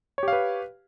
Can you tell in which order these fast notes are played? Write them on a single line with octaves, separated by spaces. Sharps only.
C#5 G4 F5 B4